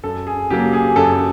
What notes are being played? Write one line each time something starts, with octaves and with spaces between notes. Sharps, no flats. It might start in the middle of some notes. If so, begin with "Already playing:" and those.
F#2 A4
G#4
C#3 F#3 A#3 G4
G#4
F#2 A4